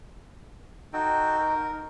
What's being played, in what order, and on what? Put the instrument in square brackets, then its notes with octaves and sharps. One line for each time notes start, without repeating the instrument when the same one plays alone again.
[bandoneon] D#4 [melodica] F#4 A4 G5
[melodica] A#4